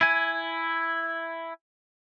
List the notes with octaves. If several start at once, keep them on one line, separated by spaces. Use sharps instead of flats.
E4 G#5